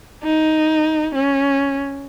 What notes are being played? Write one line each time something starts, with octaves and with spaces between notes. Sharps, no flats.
D#4
C#4